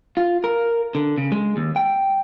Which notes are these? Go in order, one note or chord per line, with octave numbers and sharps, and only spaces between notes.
F4
A#4
D3
C#3
G#3
D#2
G5